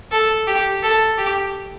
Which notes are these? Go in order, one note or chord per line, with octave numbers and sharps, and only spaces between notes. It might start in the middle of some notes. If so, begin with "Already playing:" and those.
A4
G4
A4
G4